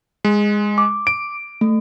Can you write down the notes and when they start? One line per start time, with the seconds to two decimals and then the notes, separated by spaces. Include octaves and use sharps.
0.25 G#3
0.78 D6
1.07 D7
1.61 A3